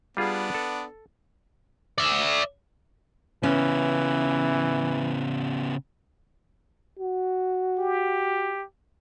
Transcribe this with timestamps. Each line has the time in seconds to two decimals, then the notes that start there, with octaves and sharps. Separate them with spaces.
0.17 G3 B3 D4 F4 G#4
0.54 A4
1.98 D5 E5
3.43 C#3 E3 B3 C#4
6.99 F#4
7.78 G4